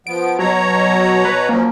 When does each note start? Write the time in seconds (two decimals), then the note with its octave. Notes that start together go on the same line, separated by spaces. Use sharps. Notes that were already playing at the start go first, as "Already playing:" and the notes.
0.07 F3 B3 D7
0.39 B2 F#3 C#5 A#5
1.25 B4
1.49 F3 F#3 A#3 C#4